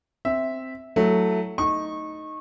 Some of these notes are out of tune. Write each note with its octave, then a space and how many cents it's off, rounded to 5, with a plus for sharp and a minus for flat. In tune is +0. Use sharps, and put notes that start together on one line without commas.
C4 +0 E5 -5
F#3 +0 A3 +5 E4 +0
D#4 +0 C#6 -25